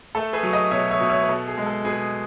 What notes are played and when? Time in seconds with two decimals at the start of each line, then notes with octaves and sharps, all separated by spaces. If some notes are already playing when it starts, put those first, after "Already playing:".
0.15 A3 A4
0.33 G#4 B4
0.43 F#3
0.53 B4 D#5
0.71 B2 C#5 E5
0.91 C#5 E5
1.00 B2
1.10 C#5 E5
1.22 B4
1.29 B2 A4
1.47 G#4
1.58 G#3
1.66 A4
1.85 B2 G#4 B4